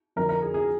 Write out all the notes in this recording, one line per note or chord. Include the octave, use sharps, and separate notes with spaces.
F2 D3 A#4
A#4
G#4
G#4